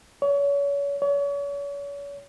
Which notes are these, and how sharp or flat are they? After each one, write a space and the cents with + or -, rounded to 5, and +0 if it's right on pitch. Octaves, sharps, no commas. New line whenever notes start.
C#5 +35
C#5 +40